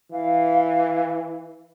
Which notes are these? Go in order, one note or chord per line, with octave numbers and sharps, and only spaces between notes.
E3 F5